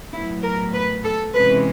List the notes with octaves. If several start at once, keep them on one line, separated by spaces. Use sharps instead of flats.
A2 F#3 B3 E4
A#4
B4
A4
C3 E3 G#3 C#4 B4